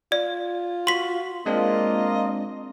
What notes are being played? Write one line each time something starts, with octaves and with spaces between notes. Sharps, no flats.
F4 D5
F#4 C6 B6
G#3 A#3 C4 D4 F4 D#5